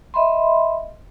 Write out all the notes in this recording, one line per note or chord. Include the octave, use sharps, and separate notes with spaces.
D#5 E5 B5 C6